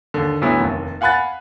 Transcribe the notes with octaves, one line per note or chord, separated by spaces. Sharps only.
D#2 D3
D2 F#3 B3 E4 A4
F1 D#2
F5 F#5 G#5 B5 F#6 A6